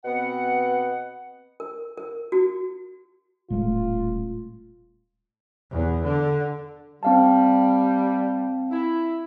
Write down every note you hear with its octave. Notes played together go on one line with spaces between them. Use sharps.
B2 B3 C4 F#5
A#4
A#4
F#4
D#1 A2 G#3 A3 F4
E2
D3
G3 C4 F5 A5
E4